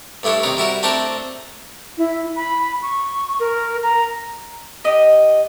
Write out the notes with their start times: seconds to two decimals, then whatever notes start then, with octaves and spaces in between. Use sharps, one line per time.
0.23 G2 A3 D4 E4 C#5
0.43 C3 D#3 C#5 D5 A#5
0.57 G3 E4 F#4 A#4
0.83 A3 C4 D4 A4 A#4 C5
1.98 E4
2.36 B5
2.82 C#6
3.40 A#4
3.83 A#5
4.84 G4 D#5